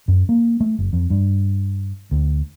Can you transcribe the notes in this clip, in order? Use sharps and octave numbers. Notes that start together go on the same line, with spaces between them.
F#2
A#3
A3
F#1
F2
G2
D2